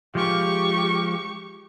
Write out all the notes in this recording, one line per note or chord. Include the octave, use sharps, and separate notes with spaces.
F3 G#3 F4 G4 C#6